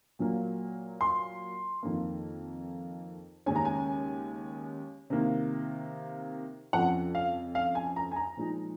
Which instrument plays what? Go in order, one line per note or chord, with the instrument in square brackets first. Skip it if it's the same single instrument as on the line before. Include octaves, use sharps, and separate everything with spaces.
[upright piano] A#2 F#3 A#3
C6
F2 D#3 A#3
D#2 C#3 G#3 C#4 G#5
A#5
G#5
C3 D#3 A#3
F2 C#3 F3 F#5
F5
F5
G#5
A#5
G#5
A#5
A#2 F3 G#3 D#4